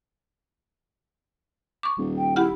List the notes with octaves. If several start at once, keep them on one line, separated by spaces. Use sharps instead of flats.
C#6 D6
D#1
G5
E4 G4 F#5 F6